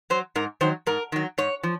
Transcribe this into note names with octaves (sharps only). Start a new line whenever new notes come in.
F#3 C5
G#2 A#4
D#3 F#3 C5
G#2 A#4
D#3 F#3
G#2 C#5
F3